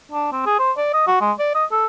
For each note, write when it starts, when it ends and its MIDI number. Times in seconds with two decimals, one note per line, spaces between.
0.12 0.31 62
0.32 0.44 60
0.46 0.57 68
0.59 0.72 72
0.77 0.89 74
0.94 1.03 75
1.07 1.17 66
1.21 1.32 56
1.39 1.51 74
1.55 1.65 75
1.71 1.86 69